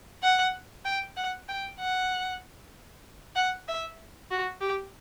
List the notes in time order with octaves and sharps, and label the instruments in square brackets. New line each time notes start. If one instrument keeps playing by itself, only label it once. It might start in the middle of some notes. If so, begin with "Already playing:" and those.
[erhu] F#5
G5
F#5
G5
F#5
F#5
E5
F#4
G4